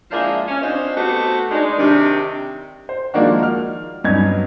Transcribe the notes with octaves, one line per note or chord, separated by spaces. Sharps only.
F3 G#3 A#3 D4 E4 E5
C#4
C4 D4 D#4 F4 C5
A3 B3 F#4 G4 B4 C5
G#3 D4 D#4
C3 D#3 D4
C5
D#3 F3 G#3 A#3 D4 F#4
F6
G2 F#3 B3 C#4 D#4 G#6